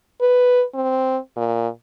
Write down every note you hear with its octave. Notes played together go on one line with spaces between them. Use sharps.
B4
C4
A#2